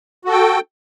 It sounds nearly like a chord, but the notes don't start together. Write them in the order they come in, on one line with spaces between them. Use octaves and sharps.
F#4 A4 G5